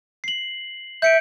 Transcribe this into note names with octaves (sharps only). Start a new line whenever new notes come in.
C7 F#7
E5 G6 C#7 D7